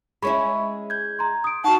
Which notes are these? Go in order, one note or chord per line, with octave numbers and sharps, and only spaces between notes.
G#3 C#4 E4 B5 C#6
G6 G#6
A#5 C6
D#6 D7
D#4 F#4 F#5 A5 C#6